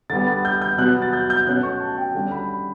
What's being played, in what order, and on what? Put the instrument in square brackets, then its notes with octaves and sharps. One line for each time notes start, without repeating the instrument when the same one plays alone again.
[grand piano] D3 G3 B3 A6
A6
G6
G6
B2 F#3 B3 F#6
A6
G6
G6
B2 A3 C#4 F#6
C#6
A5
G5
D3 G3 C#4
B5
B5